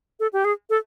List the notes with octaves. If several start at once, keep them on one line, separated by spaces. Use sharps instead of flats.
A4
G4
G#4
A4